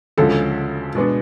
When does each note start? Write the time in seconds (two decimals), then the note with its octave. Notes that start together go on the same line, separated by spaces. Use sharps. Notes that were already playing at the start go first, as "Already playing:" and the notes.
0.18 D2 C#3 F3 G#3 A4
0.95 B2 G#3 B3 D4